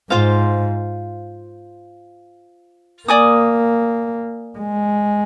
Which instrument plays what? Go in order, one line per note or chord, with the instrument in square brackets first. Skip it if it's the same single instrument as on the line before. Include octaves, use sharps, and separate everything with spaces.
[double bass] G#2 [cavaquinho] F4 C5 F5
[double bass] A#3 [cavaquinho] D5 G#5 D#6
[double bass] G#3